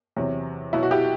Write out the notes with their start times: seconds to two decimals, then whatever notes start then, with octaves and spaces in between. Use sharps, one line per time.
0.17 E2 C3 F#3
0.73 B2 F#3 E4
0.83 F#4
0.91 E4 G4